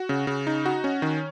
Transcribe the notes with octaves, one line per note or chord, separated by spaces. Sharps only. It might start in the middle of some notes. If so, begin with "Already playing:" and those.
Already playing: F#4
C#3
C#3
D#4
F#4
C#4
D#3